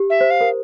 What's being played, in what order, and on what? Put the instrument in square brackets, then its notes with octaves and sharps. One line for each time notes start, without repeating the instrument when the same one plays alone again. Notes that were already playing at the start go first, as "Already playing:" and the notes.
Already playing: [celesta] G4
[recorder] E5
[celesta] C5
[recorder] F5
[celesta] A#4